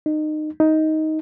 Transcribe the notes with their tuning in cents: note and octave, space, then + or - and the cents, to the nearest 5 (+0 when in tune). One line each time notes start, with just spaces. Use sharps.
D#4 -25
D#4 +10